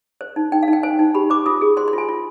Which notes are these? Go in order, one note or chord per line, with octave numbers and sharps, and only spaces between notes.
C5
D#4
D#4 G5
F5
D#4
G5
C5 G#5
D#4
G4 B5
C5 D6
F4 D#6
G#4
C5 C6
C6
F4 G#5
F4